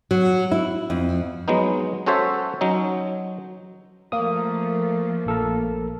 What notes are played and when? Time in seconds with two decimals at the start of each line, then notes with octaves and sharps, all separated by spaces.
0.11 F#3
0.51 E4
0.90 F2
1.48 F#3 G#3 B3 D#4
2.06 C#4 F#4 A4 C5 C#5 E5
2.61 F#3 C#4 D#4
4.12 F3 A3 A#3 D#6
5.26 A#1 A4 A#4